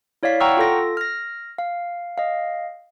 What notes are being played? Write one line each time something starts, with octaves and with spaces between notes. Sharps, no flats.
E4 C#5 D5 F5 B6
F#5 G5 A#5 C#6 E6 F6
F4 A4 A#6
F6 A#6
F5
D#5 F5